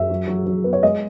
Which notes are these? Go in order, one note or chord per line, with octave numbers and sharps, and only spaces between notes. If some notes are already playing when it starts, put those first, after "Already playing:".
Already playing: F#2 E5
F#3
F#3
F#3
B3
C#5
G#3 D#5